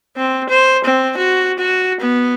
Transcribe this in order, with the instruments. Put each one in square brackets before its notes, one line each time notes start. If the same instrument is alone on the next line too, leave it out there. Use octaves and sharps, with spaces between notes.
[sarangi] C4
C5
C4
F#4
F#4
B3